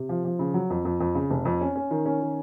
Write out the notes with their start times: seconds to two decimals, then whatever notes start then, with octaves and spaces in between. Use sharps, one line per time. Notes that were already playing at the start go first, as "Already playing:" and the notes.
Already playing: C3
0.09 F3
0.25 F3
0.39 C#3
0.54 F#3
0.70 F2
0.85 F2
1.00 F2
1.15 C#3
1.30 F1
1.45 F2
1.61 C#4
1.76 C#4
1.91 D#3
2.05 C#4
2.22 D#3